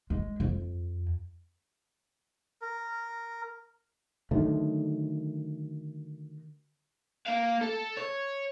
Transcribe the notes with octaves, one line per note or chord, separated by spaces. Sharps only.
G#3
F2
A#4
D3 D#3 F#3 A3
A#3 F5
A4
C#5